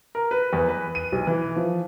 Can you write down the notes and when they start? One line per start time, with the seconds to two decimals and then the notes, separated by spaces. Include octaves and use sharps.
0.15 A#4
0.31 B4
0.53 E2
0.68 B4
0.95 D#7
1.12 B1
1.27 E3
1.56 F3